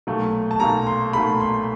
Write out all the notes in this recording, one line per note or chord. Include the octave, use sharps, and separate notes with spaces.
B1 A#2 F#3 A3
A5
B1 A#2 F#3 A3 A#5
C6
B1 A#2 F#3 A3 B5
C6